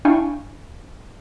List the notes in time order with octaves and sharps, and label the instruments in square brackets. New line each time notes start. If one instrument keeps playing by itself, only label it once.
[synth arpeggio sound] D4 E4 F5 G5 G#5 C#6